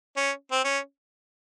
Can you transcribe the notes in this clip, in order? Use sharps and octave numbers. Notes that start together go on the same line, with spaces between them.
C#4
C4
C#4